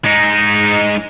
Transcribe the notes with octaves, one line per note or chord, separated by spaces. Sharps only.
G#3 D#4